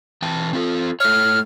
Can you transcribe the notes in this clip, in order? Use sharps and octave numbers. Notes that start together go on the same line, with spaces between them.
E3 G5 A5
C4 F4 A4
A3 C#5 F6